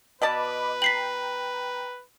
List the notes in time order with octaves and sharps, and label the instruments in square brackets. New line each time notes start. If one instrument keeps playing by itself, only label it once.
[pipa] B2 D5 A5 [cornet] B4 [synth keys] D#5 B5 D6
[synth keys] G5 A#5 [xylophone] B6 C7 F#7